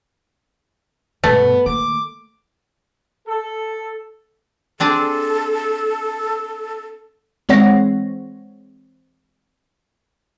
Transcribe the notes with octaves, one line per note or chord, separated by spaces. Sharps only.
G2 B2 A3 B3
D#3 A#3 D6
A4
C4 D4 G#4 A4
E3 G#3 C4 C#5 F#5 A#6